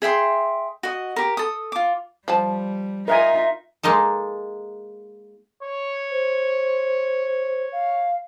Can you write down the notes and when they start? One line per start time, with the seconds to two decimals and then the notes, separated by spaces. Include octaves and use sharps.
0.02 G#4 E5 G5 C6
0.83 F#4 D#5
1.16 G4 A#4
1.37 A4 D#6
1.72 F4 D6
2.28 F3 G3 A5
3.08 D#4 F4 A#4 D#5 E5 G#5
3.83 G#3 A#3 D#4 A4
5.63 C#5
6.11 C5
7.72 F5